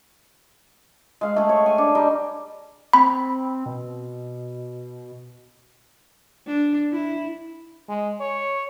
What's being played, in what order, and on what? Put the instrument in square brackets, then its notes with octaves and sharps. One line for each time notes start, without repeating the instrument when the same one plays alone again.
[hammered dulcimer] G#3 F5
A3 G#4 G5
C#5
G#5
D4
G3 D#4
[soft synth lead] C4 [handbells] B5
[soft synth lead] B2
[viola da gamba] D4
E4
[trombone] G#3
C#5